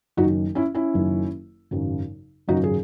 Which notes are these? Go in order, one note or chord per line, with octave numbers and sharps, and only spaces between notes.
F#1 F#2 D#3 F#3 D#4 F#4
C#4 E4
C#4 E4
F#1 F#2 D#3 F#3
G#1 F#2 C#3 F#3
G#1 F#2 C#3 F#3 D#4 F#4
G#4